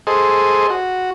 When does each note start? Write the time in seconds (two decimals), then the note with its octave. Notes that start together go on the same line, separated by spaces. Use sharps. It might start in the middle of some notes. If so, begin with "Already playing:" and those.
0.07 G#4 A4 C5 D#5
0.70 F#4